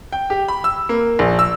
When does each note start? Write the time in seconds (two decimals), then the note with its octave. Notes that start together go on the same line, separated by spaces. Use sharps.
0.12 G5
0.30 G4
0.48 B5
0.64 E6
0.89 A#3
1.19 A#1
1.39 E6